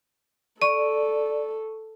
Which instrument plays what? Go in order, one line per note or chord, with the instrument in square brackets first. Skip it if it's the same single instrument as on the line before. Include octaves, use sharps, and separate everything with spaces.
[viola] A4 [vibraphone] D5 [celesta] C#6 D#7